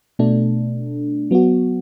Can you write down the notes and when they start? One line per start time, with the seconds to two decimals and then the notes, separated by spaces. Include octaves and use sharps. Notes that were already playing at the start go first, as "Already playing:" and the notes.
0.19 B2 A3 D4
1.31 F#3 B3 F#4